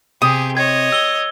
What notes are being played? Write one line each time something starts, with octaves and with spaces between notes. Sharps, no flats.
C3 G4 G#4 D#6
C#5 D#5 G#6
E6 G7